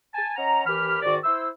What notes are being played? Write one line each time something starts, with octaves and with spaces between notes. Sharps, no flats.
G#5 A5
C#4 D#5 F#5 A#5
D#2 E3 G4 B5 F6
G#2 D#3 F#4 D5
E4 C5 E6